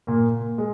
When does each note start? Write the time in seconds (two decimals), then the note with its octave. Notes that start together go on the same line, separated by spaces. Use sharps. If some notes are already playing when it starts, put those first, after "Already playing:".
0.07 A#2 A#3
0.58 G#3